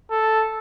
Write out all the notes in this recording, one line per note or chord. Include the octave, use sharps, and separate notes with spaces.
A4